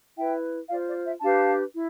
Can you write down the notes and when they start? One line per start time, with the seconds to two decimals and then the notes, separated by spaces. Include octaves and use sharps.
0.16 E4 B4 E5 G5
0.69 F4 C5 D5 F5
0.87 D5
1.04 E5
1.21 D4 G4 B4 F5 A5
1.74 E4